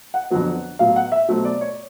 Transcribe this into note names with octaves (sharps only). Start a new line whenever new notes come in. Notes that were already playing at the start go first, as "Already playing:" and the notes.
F#5
F2 D3 F#3 B3
A2 F#3 B3 F5
F#5
E5
B2 F#3 A3 C4
D5
C#5